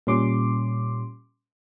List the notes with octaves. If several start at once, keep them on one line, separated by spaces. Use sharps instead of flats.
A#2 G3 C#4 C6 D6